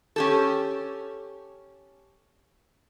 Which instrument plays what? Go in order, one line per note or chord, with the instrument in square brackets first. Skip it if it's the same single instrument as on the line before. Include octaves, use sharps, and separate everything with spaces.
[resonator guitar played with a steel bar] C#4 G4 A4